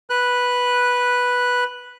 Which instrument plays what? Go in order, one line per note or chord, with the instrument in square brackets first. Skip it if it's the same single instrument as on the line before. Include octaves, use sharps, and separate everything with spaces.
[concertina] B4 F#6